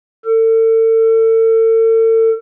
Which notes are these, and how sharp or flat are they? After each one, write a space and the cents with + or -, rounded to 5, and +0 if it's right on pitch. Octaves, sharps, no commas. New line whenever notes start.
A4 +40